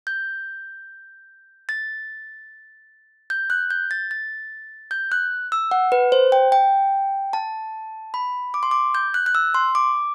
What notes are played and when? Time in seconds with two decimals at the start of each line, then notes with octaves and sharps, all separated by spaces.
0.07 G6
1.69 A6
3.30 G6
3.50 F#6
3.71 G6
3.91 A6
4.11 A6
4.91 G6
5.12 F#6
5.52 E6
5.71 F#5
5.92 B4
6.12 C5
6.32 G5
6.52 G5
7.33 A5
8.14 B5
8.54 D6
8.63 C6
8.71 D6
8.95 G6
9.14 F#6
9.26 F#6
9.35 E6
9.54 C6
9.75 D6